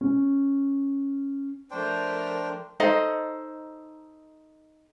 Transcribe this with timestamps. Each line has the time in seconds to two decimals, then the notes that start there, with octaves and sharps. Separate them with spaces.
0.01 C#4
1.71 F3 A3 D4 A#4 C5 G5
2.80 D#4 A4 C5 D#5